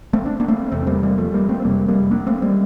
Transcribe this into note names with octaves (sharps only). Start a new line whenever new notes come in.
A3 C4
D4
A#3 D4
A3 C4
E2 C3 A3 C4
G3 A#3
G3 A#3
F3 A3
G3 A#3
A3 C4
C4
F2 C3 G3 A#3
G3 A#3
A#3 D4
A3 C4
G3 A#3